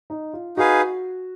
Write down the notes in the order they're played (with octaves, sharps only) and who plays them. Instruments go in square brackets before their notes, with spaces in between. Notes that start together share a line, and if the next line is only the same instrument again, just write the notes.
[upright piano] D#4
F4
[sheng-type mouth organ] D#4 G#4 B4 F5 G#5 [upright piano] F#4